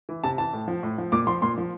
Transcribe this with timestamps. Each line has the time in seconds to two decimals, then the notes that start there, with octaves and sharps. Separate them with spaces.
0.09 E3
0.24 C3 A5
0.38 E3 A5
0.53 A2
0.68 F3
0.83 A2
0.98 F3
1.12 A#2 D6
1.27 F3 C6
1.42 A#2 C6
1.57 F3